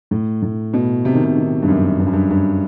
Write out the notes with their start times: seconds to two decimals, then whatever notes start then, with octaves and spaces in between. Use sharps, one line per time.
0.11 A2
0.42 A2
0.74 B2
1.05 C3
1.15 D#3
1.25 C3
1.36 D#3
1.63 G2
1.68 F#2
2.00 G2
2.06 F#2
2.13 G2
2.31 G2